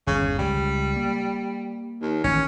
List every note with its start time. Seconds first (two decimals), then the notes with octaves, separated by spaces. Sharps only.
0.07 G1 E2 C#3
0.39 C#2 G3
0.96 A#3
2.02 D#2
2.24 A1 D#3 C#4